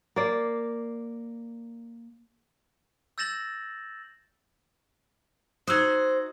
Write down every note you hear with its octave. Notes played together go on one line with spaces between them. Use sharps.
A#3 D5
E6 G6 A6 A#6 E7 F#7
D#4 F#4 C5 D#6 E6 G#6